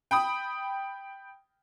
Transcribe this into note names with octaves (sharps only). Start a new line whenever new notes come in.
G5 B5 D#6